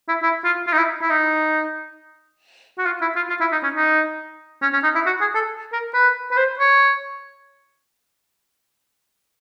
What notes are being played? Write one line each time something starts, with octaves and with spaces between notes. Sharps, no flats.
E4
E4
F4
F4
D#4
E4
E4
D#4
F#4
F4
E4
F4
F4
E4
D#4
C#4
D#4
C#4
C#4
D#4
E4
F#4
G#4
A4
A#4
B4
B4
C5
C#5